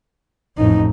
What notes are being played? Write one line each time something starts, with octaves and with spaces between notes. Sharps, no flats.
A1 F2 D#4